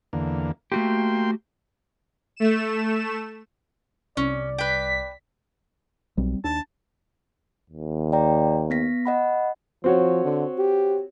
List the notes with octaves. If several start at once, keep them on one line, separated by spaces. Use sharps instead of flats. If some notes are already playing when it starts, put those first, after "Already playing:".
E2 D3 A#3
A3 A#3 F#4 G4 G5 C6
A3 E7
C2 C#4 D5
B4 G5 B6
B1 G3 C4
D#2 D4 A5
D#2
D5 G5 A#5
B3 A#6 B6
D#5 F#5 B5
F3 C4 F#4 C#5
D3
G4